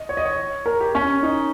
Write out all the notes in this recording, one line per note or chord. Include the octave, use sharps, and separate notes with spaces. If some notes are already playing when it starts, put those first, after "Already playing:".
Already playing: D#5
C#5
D#5
C#5
A#4
G4
C#4
D#4